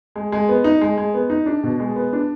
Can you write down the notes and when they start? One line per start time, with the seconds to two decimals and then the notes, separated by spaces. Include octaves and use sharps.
0.16 G#3
0.32 G#3
0.49 B3
0.64 D#4
0.81 G#3
0.97 G#3
1.14 B3
1.30 D#4
1.46 D4
1.63 B2
1.80 G#3
1.96 B3
2.13 D4